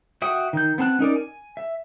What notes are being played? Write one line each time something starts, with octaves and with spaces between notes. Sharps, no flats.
F#4 E5 G5 D#6
D#3 G6
B3 C4 A5 F#6
C#4 D#4 A#4 D5
G#5
E5